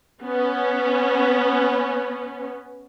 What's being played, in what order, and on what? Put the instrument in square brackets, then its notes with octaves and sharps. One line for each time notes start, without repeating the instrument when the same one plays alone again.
[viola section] B3 C#4